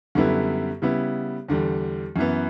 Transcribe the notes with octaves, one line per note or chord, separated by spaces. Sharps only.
F#2 D3 G3 B3 E4
C#3 G3 B3 E4
E2 D3 G3
F#2 E3 B3